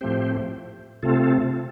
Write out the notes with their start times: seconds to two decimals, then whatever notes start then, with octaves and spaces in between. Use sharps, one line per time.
0.01 A2 F3 A3 C4 G4 C5
1.03 C3 A3 C4 F4 A4